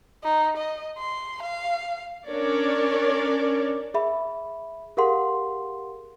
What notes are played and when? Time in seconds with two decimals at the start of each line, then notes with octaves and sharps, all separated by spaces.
0.23 D#4
0.57 D#5
0.98 C6
1.43 F5
2.27 C#4 D4 A#4 C#5 D5
3.94 G#4 E5 B5
4.97 G4 G#4 A#4 F5 F#5 C6